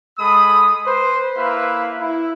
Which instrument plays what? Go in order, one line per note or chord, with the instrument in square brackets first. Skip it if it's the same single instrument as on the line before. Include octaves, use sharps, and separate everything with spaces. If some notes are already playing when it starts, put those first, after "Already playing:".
[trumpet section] G#3 A4 B5 D#6
B4 C5
A#3 E4 B4 E5 F5
E4